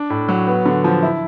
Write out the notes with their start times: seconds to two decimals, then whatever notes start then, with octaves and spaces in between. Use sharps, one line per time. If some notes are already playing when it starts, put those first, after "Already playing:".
Already playing: D4
0.10 A2
0.29 F#3
0.47 B3
0.66 D3
0.84 F3
1.03 E4